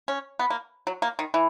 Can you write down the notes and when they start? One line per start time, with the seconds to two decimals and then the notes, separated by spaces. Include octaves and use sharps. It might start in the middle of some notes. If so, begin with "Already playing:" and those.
0.08 C#4
0.39 B3
0.50 A#3
0.87 F#3
1.02 A#3
1.19 D#3
1.34 E3